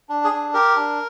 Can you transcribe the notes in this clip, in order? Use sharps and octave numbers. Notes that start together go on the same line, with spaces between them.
D4
G#4
D4
G4 A#4
D4